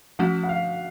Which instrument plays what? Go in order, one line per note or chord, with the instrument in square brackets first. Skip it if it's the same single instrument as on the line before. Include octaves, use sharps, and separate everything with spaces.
[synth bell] F3 A3 C#4 F#4 [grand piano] F#5
[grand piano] F#5
F5